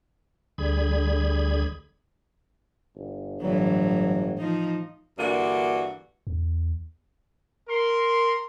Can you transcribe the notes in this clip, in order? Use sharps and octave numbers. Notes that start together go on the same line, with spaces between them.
D2 D3 G3 G#4 B5 G#6
G1
G1 A2 E3 F#3
F3 D#4
G2 D3 E3 A#3 D4 F#4
E2
A#4 C6